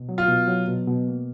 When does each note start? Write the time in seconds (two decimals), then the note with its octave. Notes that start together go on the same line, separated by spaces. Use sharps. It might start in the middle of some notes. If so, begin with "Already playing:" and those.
Already playing: B2
0.09 F#3
0.18 F4
0.28 B2
0.48 F#3
0.68 B2
0.87 B2
1.08 A#3